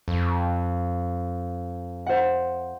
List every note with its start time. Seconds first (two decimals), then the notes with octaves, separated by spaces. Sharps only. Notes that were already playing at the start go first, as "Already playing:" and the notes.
0.08 F2
2.06 C5 F#5